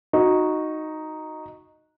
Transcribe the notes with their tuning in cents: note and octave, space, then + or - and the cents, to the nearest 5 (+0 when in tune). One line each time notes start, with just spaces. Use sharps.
D#4 +0 F#4 -10